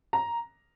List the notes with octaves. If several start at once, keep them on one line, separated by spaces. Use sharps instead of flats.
A#5